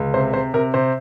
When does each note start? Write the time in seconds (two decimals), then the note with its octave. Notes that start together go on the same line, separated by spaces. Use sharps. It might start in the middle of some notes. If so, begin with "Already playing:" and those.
Already playing: C#2
0.14 C3 C5
0.33 C3 C5
0.54 C3 A#4
0.74 C3 C5